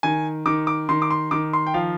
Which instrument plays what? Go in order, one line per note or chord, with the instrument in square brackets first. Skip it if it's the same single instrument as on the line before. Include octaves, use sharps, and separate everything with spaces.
[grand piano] D#3 G#5
D#3 D6
D6
D#3 C6
D6
C6
D#3 D6
C6
G5
F3 F5